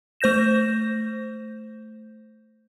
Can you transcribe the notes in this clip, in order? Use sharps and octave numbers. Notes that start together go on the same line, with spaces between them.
A3 C5 G6 A#6 E7